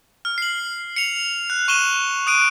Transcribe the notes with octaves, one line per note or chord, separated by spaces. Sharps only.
F6
C7 F#7
C#7 F7
F#6
C#6 D#7 E7 G7
D#6 F#6 D7 D#7